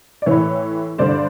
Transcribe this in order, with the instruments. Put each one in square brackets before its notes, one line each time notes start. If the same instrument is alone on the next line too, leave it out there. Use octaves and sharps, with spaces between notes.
[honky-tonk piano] D5
A2 E3 B4 C#5
G2 D3 C5 D5